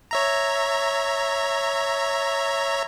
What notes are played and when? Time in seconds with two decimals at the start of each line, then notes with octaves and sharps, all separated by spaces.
0.11 C#5 E5 A#5